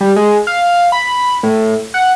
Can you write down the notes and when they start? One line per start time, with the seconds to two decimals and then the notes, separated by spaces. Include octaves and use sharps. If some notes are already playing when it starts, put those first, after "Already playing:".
0.01 G3
0.16 G#3
0.47 F5
0.92 B5
1.43 A2
1.94 F#5